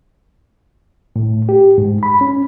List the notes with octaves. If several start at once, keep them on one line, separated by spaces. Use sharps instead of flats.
A2
G4
G#2
B5
C#4